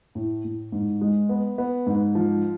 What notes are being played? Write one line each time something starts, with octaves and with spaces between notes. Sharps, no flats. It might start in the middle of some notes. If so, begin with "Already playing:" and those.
A2
A2
G#2
G#3
B3
B3
G#2
F3